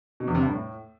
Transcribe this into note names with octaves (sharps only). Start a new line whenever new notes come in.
B2
E2
C3
G2
A2